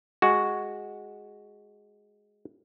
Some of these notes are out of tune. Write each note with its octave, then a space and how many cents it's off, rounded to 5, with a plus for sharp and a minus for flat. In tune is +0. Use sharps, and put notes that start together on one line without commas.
G#3 +0 F#4 +0